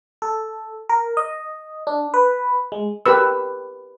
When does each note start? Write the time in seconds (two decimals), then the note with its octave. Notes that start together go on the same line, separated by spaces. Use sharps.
0.22 A4
0.89 A#4
1.17 D#5
1.87 D4
2.14 B4
2.72 G#3
3.06 G4 A#4 B4 E6